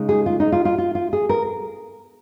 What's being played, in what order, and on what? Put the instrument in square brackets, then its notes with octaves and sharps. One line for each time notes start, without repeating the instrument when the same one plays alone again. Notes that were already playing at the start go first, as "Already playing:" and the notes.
Already playing: [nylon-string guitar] C#3 G#3 D#4
G#4
F4
D#4
F4
F4
F4
F4
G#4
A#4